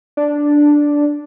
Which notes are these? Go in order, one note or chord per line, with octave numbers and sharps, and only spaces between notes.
D4